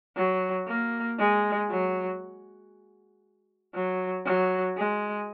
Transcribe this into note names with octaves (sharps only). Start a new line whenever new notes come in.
F#3
A#3
G#3
F#3
F#3
F#3
G#3